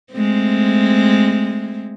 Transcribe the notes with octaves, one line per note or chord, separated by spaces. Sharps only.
G#3 A3 C4